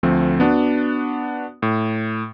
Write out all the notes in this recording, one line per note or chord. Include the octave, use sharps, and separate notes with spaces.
D2 F3 A3 C4
B3 D4 F#4
A2